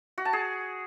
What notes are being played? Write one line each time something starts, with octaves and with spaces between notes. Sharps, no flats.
F#4
A5
G#4